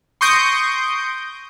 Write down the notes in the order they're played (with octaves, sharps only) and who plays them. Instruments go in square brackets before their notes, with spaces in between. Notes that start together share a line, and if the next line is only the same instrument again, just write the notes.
[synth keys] C6 C#6 D#6 G6 A#6 D7